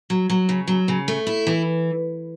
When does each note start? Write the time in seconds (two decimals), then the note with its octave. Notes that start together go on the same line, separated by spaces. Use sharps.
0.10 F#3
0.30 F#3
0.49 C#3
0.67 F#3
0.88 C#3
1.08 A3
1.27 E4
1.47 E3